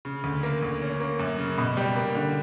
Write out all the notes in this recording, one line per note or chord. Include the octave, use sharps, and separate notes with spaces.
C#3
D2
A#3
D2
C#4
A#3
F#2
C#3
B2 B5
G3
A#3
D3